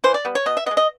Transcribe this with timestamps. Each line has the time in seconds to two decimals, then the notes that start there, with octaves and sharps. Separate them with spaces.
0.04 E3 C5
0.14 D5
0.25 G3 B3
0.35 C#5
0.46 B2 D#5
0.57 E5
0.66 B3 D#5
0.71 G#3
0.77 D#5